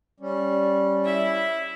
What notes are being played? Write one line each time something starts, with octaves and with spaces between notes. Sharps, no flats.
G3 C#4
E4 E5